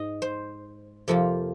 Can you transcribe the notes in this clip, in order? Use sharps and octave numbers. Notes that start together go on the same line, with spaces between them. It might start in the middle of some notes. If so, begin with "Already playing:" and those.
Already playing: G#2 D#4 D#5
C5
F2 C3 F3 A#3 F4